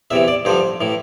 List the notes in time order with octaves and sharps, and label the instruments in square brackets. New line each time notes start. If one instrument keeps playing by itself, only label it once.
[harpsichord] E2 C3 E3 E5
D5
G2 D3 F3 C5
A2 E3